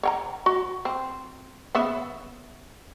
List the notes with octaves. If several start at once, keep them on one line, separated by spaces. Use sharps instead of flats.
C#5 G5 A#5
F#4
C4
C#3 B3 E5